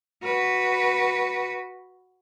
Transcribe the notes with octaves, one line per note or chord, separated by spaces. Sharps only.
F#4 B4